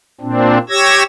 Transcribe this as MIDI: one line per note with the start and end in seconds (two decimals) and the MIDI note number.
0.21 0.58 46
0.21 0.58 60
0.21 0.58 62
0.69 1.03 67
0.69 1.03 73
0.69 1.03 88
0.69 1.03 92
0.69 1.03 94